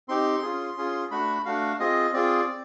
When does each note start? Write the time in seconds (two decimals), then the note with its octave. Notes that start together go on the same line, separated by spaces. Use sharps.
0.08 C4 D#4 G4 C6
0.42 C#4 F4 G#4
0.77 C#4 F4 G#4
1.11 A3 D4 F#4 B5
1.45 A3 D4 F#4 F5
1.80 C4 F4 G#4 D#5
2.13 C4 F4 G#4 D5
2.48 C4